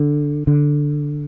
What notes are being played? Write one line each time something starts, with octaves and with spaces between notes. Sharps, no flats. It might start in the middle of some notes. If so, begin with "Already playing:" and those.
Already playing: D3
D3